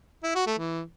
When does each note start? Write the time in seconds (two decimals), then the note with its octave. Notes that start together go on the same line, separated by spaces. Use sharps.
0.24 E4
0.35 F#4
0.47 A3
0.58 E3